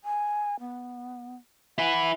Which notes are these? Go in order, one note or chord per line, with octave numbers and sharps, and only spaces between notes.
G#5
B3
E4 B4 F#5